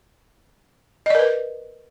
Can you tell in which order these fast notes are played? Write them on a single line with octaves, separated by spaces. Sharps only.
D#5 D5 A#4 B4